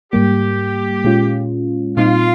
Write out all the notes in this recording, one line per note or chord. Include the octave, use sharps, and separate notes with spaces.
G#2 G3 A#3 G4
A#2 G#3 C#4 F4
A#2 G3 C4 D#4 F4